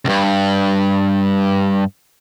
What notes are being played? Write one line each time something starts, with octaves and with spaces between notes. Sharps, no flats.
C#2 G2